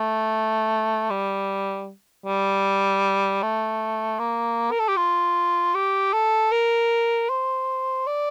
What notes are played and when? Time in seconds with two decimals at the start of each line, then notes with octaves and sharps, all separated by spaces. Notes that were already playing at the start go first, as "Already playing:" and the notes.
Already playing: A3
1.10 G3
2.26 G3
3.42 A3
4.19 A#3
4.71 A#4
4.79 A4
4.88 G4
4.97 F4
5.75 G4
6.13 A4
6.52 A#4
7.29 C5
8.07 D5